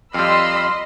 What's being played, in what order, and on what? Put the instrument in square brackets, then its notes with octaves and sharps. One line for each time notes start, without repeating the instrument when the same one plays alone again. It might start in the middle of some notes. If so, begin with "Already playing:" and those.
[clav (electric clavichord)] F2 G3 [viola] D#5 [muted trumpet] F5 [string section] B5 C6 E6